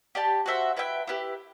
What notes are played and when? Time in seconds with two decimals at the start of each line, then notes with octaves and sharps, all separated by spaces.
0.15 G4 D5 A5
0.46 F#4 C5 E5
0.77 E4 B4 E5 G5
1.07 E4 G4 B4